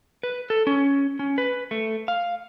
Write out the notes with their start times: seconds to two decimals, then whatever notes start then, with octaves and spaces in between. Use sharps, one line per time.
0.23 B4
0.50 A4
0.67 C#4
1.19 C#4
1.38 B4
1.71 A3
2.08 F5